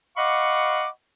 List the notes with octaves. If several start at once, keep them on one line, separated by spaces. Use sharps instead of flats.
D#5 F5 F#5 B5 C#6 D6